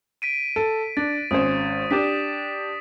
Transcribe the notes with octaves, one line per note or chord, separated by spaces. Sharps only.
B6 D7 D#7
A4
D4 A6
G#1 C#4 C5 D#6
D4 G4 D5 B6 E7